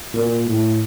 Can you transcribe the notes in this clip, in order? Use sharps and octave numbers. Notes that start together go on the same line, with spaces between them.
A#2
A2